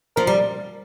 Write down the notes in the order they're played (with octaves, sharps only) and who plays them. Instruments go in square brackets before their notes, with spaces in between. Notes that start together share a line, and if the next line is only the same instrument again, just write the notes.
[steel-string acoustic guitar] F3 [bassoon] A#4
[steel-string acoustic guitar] G3